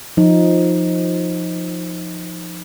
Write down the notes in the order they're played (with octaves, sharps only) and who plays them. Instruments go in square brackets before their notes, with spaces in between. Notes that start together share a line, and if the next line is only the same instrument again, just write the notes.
[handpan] F3 D#4